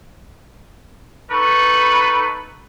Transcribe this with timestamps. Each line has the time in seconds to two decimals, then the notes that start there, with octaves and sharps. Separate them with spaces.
1.30 D#4 A4 B4 C#6